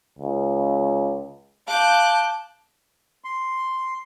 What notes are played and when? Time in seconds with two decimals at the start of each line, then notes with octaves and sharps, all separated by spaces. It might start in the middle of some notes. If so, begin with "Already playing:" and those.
0.19 C#2
1.68 F5 A5 D6 F#6 G6
3.24 C6